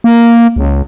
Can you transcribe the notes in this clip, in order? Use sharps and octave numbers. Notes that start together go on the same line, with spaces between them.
A#3
C#2